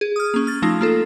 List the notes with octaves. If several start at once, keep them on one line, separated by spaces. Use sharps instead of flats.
G#4
D#6 F6
A#3 C#4
F6 A6
F3 A3 D#4 F4
A#3 F4 A4